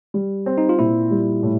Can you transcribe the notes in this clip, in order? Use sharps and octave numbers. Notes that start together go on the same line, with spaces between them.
G3
C4
D#4
F4
A#2 E4
G3
A2